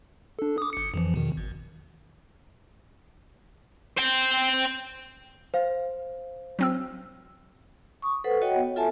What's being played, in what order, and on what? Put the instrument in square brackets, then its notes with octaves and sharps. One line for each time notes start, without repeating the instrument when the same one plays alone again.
[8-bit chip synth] D4 A4
D6 D#6
G1 C#7
F2 E3 F3
E2 B2 D#3
G#1
[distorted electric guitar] C5 G5
[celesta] C5 F5
[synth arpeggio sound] F#3 C4 E6
[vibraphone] C#6 D#6
A4 B4 C5 F#5
F#4 C#5 D#5 F#5 G5
B3
F4 A4 E5 G#5 A5